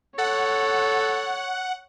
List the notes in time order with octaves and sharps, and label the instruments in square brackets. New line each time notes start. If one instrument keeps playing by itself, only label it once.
[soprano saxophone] A4 [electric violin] C#5 [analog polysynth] F#5